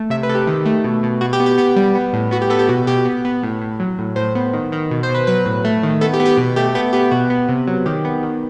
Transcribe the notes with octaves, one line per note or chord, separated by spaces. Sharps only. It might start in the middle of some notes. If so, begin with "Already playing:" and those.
Already playing: A3
C3 E5
B4
C3 A4
G4
D#3
A3
B2
B2
B2 F#4
G4
B3
G4
B3 G4
G3
B3
A2
B3 F#4
G4
B3 A4
G4
B2 F#4
B2 G4
B3
B3
A2
A2
F#3
A2
A2 C5
B3
D#3
D#3
B2
C5
B2
B4
F#3 B4
A2
A3
D#3
B3 A4
G4
B3
G4
B2
A3 G4
B3 G4
B3 G4
B2 F#4
B3
C3
F#3
D#3 G4
B3
D#3